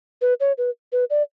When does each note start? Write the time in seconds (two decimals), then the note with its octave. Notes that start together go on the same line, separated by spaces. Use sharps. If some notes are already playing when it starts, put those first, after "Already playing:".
0.22 B4
0.40 C#5
0.58 B4
0.92 B4
1.10 D5